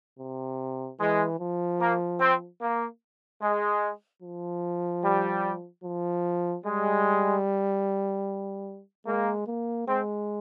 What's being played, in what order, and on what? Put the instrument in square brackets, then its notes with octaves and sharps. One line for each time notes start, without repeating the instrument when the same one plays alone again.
[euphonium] C3
[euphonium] E3 [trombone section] G#3
[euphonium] F3
[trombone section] A#3
C4
A#3
G#3
[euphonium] F3
[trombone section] G3
[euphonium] F3
[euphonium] G3 [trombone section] G#3
[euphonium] G#3 [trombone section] A#3
[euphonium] A#3
[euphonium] G#3 [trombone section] C4